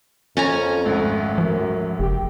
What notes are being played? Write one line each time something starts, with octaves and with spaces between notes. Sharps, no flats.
F2 C#4 G#5 A#5
G#1 D2
F#2 F3
F#1 G4